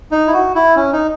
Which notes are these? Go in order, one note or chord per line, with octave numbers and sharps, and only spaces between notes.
D#4
E4
F#4
E4
C#4
D#4